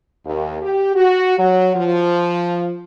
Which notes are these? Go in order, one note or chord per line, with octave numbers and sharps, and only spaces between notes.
D#2
G4
F#4
F#3
F3